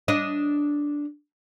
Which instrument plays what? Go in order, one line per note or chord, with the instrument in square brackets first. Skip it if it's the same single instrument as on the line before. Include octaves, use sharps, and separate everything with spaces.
[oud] D4 D#5